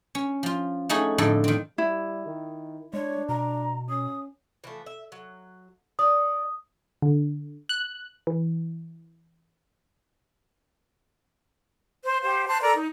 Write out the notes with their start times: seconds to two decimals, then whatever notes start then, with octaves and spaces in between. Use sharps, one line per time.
0.15 C#4
0.43 F3 F4
0.89 A3 C#4 D#4 F#4 G#4
1.18 F2 A2 D3 D#4 A4
1.44 D#3 C4
1.78 G3 E4
2.26 D#3
2.94 G#3 D4 C#5
3.29 B2 A#5
3.89 C#4 D#6
4.64 E3 F3 A3
4.86 E5
5.12 F#3
5.99 D#4 D5 D#6
7.02 D3
7.69 F#6
8.27 E3
12.04 C5
12.22 G4 C5 F5
12.47 C5 A5 F#6
12.62 A4 A#4 D5 A#5
12.75 D#4